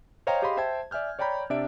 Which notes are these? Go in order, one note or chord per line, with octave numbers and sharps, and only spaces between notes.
C5 C#5 D#5 F5 G5 A#5
G4 G#4 D#5 F5 B5 C6
C5 E5 G5 A5 G#6
D5 E5 G#5 F6 G6
C#5 D5 G5 A#5 B5 G6
C3 D4 D5 E5 D7